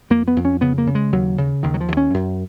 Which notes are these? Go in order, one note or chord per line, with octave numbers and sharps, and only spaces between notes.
F2 A#3
B3
F2
C#4
C#3 B3
A#3
C#3
G#3
D#2 F#3
C#3
D#2 D#3
F#3
F3
D#2
C#4
F#2